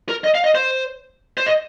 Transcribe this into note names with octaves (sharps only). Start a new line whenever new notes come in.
A#4
D#5
F5
D#5
C5
C5
D#5